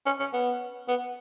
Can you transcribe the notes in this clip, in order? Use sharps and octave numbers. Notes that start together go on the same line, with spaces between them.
C#4
C#4
B3
B3